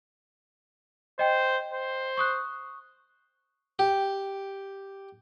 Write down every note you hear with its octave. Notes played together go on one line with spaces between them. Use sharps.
C5 D#5 G5
C5
C#6 D#6 F#6
G4